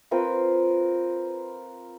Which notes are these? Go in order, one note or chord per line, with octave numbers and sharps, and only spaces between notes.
C4 F4 A#4 B4